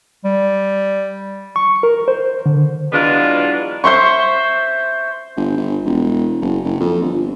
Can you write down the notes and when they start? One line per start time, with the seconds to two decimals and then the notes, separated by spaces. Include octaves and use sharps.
0.25 G3
1.56 C#6
1.83 A#4
2.08 C5
2.46 D3
2.93 E3 F#3 G#3 B3 D4 F4
3.84 C5 E5 C6 C#6
5.36 G1
5.57 G1
5.85 E1
6.41 F#1
6.65 F#1
6.80 F2
7.02 G1